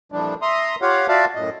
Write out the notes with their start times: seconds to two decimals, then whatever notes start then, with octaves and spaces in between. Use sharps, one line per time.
0.12 F2 A#2 E3 F3 G3 D4
0.42 E5 A#5 C6 D#6
0.82 F4 G4 C#5 F5 F#5
1.09 F4 F#4 D5 E5 F5 A5
1.35 F#2 A2 D#5